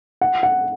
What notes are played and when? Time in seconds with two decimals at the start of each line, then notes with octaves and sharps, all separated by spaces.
0.21 F#5
0.43 F#5